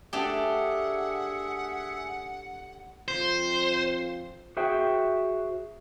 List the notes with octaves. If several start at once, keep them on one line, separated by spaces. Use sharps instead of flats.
A3 D4 G4 G#4 E5 F#5
F2 C4 F4 C5
F#4 G#4 C5 E5 G5